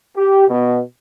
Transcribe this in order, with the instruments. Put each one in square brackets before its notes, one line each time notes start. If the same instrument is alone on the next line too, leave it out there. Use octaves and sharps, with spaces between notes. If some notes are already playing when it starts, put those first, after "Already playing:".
[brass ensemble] G4
B2